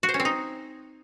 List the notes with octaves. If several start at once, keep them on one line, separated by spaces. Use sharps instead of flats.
F#4
C5
C#4
C4
D#4